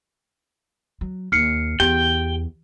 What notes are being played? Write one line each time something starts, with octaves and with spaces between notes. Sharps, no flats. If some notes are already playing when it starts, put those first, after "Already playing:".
F#3
D#2 F6 C7 C#7
E2 G4 G5